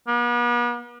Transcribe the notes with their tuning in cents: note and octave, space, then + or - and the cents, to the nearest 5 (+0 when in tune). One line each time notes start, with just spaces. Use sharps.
B3 -45